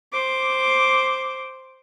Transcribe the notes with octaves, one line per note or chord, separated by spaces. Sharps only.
C5 D6